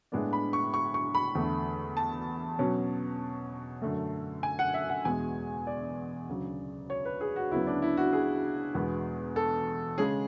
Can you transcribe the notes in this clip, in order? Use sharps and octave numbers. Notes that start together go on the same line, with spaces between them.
A2 G#3 B3 D4
B5
C#6
C#6
C#6
B5
E2 D3 A3
A5
B2 F#3 C#4
F#2 D3 A3
G#5
F#5
E5
F#5
E2 B2 G#3 G#5
D5
D2 C#3 F#3
C#5
B4
G#4
F#4
D2 C#3 F#3 B3 E4
D4
E4
F#4
G#4
E2 B2 G#3 B3
A4
C#3 G#3 C#4 G#4